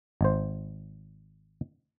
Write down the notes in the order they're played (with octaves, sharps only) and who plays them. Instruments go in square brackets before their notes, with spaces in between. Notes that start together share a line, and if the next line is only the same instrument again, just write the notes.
[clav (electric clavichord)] G#1 C5